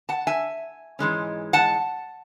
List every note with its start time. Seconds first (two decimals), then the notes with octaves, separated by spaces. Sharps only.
0.09 F#5 A5
0.27 E5 G#5
0.99 G#2 E3 G#3 C#4
1.53 F#5 A5